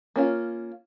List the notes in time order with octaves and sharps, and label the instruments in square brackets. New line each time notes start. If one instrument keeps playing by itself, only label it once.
[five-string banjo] A#3 C#4 F4